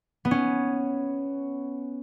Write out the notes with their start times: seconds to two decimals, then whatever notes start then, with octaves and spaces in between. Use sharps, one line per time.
0.25 B3
0.31 C#4